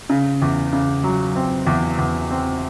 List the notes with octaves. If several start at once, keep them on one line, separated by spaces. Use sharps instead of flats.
C#3
E2
C#3
F#3
C4
E2
E2
C4